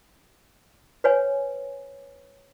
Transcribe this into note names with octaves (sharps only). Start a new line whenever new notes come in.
B4 C#5 G#5